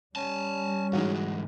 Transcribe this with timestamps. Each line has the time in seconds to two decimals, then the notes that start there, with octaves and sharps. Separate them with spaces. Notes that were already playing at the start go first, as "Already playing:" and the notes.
0.16 G3 C#4 G#5 A5
0.93 G#2 E3 G#3 D#4 F#4